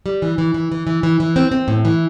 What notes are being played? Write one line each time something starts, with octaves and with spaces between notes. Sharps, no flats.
G3
E3
E3
E3
E3
E3
E3
E3
C4
C4
A2
E3